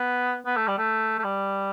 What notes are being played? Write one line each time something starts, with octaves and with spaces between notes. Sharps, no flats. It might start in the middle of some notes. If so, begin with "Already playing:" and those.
Already playing: B3
B3
A3
G3
A3
A3
G3